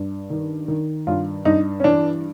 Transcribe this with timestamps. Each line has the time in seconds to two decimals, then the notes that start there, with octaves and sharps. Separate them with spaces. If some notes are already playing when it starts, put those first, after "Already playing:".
Already playing: G2
0.30 D#3
0.68 D#3
1.07 G2 F4
1.45 G2 D#4
1.80 C#4
1.84 E3 D4